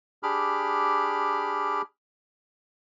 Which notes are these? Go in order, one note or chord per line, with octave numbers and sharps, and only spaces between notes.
D4 G4 G#4 B5 D6 F6